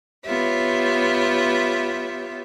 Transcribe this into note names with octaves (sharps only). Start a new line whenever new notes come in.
B3 F4 G4 C#5 E5